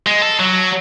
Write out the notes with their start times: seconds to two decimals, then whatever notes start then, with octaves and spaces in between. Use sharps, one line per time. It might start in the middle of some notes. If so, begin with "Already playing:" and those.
0.07 G#3
0.22 A4
0.39 F#3